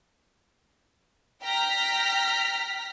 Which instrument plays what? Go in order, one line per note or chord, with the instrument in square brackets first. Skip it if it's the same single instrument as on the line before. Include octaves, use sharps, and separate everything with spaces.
[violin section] G5 A#5 F6 B6